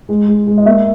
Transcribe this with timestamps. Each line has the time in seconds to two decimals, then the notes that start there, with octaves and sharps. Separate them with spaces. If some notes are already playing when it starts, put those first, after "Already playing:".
0.09 G#3
0.28 G#3
0.47 G#3
0.57 D#5
0.66 A#3 E5